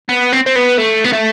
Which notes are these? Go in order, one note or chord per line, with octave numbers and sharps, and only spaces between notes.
B3
C4
C4
B3
A3
B3
A3